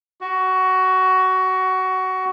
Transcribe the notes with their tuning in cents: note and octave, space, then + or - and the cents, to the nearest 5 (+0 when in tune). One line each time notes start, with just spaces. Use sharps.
F#4 +15